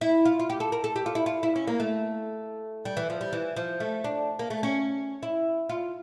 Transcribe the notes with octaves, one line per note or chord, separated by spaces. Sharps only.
E4
F4
F4
G4
A4
A#4
A4
G4
F4
E4
F4
E4
C#4
A#3
A3
G3
E3
F3
G3
E3
F3
A3
D4
A#3
A3
C#4
E4
F4